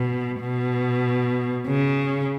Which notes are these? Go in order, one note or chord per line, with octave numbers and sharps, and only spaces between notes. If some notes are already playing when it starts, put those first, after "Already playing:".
Already playing: B2
B2
C#3